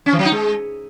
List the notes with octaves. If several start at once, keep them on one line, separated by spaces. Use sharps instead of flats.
C#4
E3
F#3
D#4
G#3